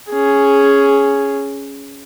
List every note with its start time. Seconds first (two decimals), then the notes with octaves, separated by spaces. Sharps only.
0.11 C#4 G#4